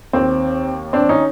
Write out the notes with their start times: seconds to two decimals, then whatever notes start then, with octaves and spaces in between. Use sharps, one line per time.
0.13 D#2 D#3 C4
0.93 C4 D4
1.09 C#4 D#4